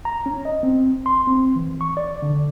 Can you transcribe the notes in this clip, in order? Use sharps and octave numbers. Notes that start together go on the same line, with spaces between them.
A#5
C#4
D#5
C4
C6
C4
E3
C#6
D5
D3